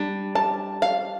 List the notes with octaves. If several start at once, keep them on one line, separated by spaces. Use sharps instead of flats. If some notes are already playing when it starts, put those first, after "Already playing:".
Already playing: G3 D4
A5
F5